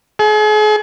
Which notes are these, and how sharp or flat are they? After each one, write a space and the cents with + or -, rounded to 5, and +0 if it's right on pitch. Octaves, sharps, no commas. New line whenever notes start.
G#4 +40